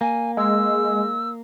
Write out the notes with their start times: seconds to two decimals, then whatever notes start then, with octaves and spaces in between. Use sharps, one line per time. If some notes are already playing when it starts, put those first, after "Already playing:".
0.01 A#3 G#5
0.37 G#3 E6